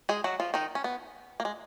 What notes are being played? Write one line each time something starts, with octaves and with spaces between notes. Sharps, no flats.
G#3 G#4
F#3 F#4
F3 F4
D#3 D#4
C#4
B3
A#3
G#3